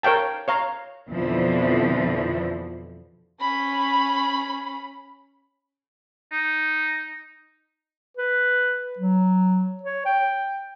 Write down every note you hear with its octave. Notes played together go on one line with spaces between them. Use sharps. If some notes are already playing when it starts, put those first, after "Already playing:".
A#4 C#5 F5 G5 A5
C#5 F5 A#5
F2 B2 D3 E3 F3
C#4 B5
D#4
B4
F#3
C#5
G5